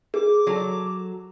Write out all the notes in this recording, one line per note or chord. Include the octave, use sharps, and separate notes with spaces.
G#4 D6
F#3 A4